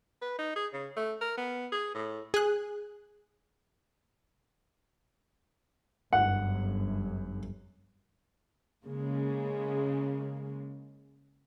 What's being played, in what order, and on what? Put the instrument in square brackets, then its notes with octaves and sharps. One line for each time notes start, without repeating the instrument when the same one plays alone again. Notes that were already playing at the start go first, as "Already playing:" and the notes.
[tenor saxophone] B4
D#4
G#4
C#3
A3
A#4
B3
G#4
A2
[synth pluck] G#4 F#6
[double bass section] G1 F#2 [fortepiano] F#5
[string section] C#3 G#3 A#3